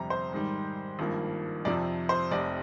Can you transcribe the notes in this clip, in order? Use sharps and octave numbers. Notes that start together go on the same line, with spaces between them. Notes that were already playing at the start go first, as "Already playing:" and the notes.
Already playing: G1 F2 C3 G3 A#5
C5
G#2 D#3 G3
G#1 G2 F3 A#3
F2 C3 F3 D5
C5
F1 F2 C3 D5